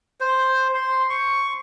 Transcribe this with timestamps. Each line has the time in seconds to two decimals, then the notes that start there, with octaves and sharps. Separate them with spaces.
0.20 C5
0.75 C6
1.10 C#6